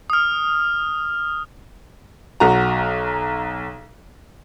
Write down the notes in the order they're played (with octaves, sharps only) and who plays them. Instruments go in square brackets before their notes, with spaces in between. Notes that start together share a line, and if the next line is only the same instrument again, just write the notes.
[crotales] D#6 F6
[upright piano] B1 F#4 A#5